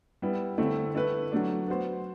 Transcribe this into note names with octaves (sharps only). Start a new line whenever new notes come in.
G3 B3 E4
D3 A3 C4 E4
A3 E4 B4
F#3 A3 D4
B3 F#4 C5